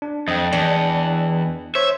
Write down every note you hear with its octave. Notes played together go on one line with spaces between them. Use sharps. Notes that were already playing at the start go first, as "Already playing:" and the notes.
D4
F2 D#5 G5
E2 D4
C5 C#5 E5